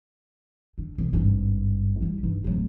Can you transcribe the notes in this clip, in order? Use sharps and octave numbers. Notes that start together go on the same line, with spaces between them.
D3
B1
G#1 G2
G3 E4
G2 D#4
D1 F#3